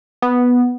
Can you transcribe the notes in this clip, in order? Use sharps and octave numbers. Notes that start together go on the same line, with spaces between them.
B3